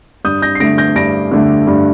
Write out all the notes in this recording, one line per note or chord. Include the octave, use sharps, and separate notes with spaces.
G2 D#6 G6
G6 A#6
C7
D3 A3 A#6 D7
G6 A#6
G2 A#6 D7
D3 A3
G2